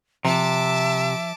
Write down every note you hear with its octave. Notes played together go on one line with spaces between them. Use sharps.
C3 F3 E5 A5 D6